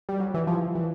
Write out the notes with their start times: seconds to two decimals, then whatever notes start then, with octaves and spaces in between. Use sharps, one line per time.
0.09 G3
0.20 F#3
0.34 E3
0.47 F3
0.75 E3